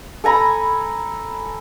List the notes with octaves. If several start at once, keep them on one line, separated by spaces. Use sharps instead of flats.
A4 G#5 A#5 B5